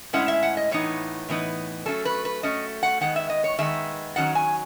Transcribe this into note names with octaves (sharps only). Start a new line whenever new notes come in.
A2 G#3 C#4 E4 F#5
E5
F#5
D#5
A2 E3 B3 D#4 C#5
A2 E3 B3 D#4
F#3 A3 C#4 A4
B4
B4
F#3 A3 C#4 D#5
F#5
D#3 G#3 B3 F#5
E5
D#5
C#5
D#3 G#3 B3 E5
D#3 F#3 C#4 F#5
G#5